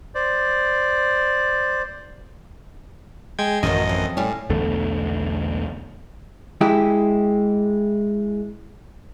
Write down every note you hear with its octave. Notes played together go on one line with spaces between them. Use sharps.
C5 D5
G#3 G5 G#6
A1 F#2 D#3 E3 F#3 D#5
F2
A2 G3 C#4
B1 E2 D3 A3
G#3 E4 G4